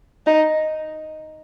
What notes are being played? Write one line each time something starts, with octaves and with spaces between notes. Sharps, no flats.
D#4